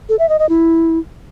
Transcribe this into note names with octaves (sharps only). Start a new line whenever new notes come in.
A4
E5
D#5
D#5
E4